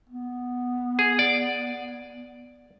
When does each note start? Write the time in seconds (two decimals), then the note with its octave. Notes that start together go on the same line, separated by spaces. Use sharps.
0.09 B3
0.99 G#4
1.19 D5